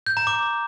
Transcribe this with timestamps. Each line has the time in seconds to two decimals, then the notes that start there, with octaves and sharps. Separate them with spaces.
0.07 G6
0.17 A#5
0.27 D6